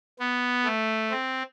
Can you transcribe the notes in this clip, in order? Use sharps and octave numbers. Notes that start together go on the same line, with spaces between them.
B3
A3
C4